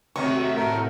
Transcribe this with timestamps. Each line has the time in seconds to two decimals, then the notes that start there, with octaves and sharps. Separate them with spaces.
0.16 C3 D#3 F#3 A3 F#4 E5 C#6
0.56 A2 A3 A#4